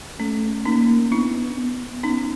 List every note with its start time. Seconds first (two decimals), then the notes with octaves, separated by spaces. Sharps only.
0.19 A3 C#4
0.65 A#3 C#4 D#4
1.11 B3 D4 E4
1.58 B3
2.03 B3 C#4 D#4